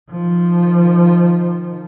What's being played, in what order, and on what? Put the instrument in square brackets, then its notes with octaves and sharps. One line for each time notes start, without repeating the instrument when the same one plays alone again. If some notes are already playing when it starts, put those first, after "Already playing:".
[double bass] D#3 F3